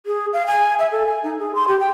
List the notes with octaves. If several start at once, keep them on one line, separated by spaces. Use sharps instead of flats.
G#4
F5
G#5
E5
A4
G#5
D#4
G#4
C6
G4
G5